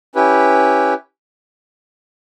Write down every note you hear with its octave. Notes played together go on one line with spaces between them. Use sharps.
C#4 E4 G4 B4